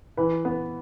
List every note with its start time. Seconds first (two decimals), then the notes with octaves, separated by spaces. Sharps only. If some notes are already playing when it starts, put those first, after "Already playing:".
0.17 E3 B4
0.45 B3